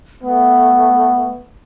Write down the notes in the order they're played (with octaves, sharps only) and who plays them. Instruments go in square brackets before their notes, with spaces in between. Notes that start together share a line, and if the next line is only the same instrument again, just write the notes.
[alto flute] A3 [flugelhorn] B3